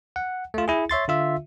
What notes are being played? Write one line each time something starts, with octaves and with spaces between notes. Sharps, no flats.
F#5
A3 F4
E4 G#4
C#5 E5 C6 A6
D3 F4 E5